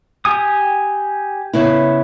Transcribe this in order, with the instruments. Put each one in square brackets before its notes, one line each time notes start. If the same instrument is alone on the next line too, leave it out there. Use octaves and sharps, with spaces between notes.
[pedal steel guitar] G4 G#5 D#6
[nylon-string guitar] C#3 B3 E4